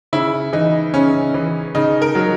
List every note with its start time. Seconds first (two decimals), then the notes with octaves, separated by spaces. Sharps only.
0.13 C#3 E4
0.53 E3 D#4
0.93 C#3 C#4
1.34 E3
1.75 C#3 D#4
2.02 A#4
2.15 F#3